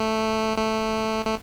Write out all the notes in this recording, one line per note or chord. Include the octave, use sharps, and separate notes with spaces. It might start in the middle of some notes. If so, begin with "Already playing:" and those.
Already playing: A3
A3
A3